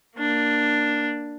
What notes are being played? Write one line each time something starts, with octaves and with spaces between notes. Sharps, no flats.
A#3 D4